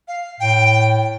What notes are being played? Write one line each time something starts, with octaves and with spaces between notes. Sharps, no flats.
F5
A2 G5